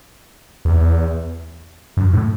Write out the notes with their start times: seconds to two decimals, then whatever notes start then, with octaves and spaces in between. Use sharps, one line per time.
0.65 E2
1.97 F#2
2.13 A2